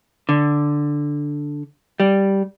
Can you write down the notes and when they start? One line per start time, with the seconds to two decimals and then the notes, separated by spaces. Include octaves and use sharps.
0.29 D3
2.00 G3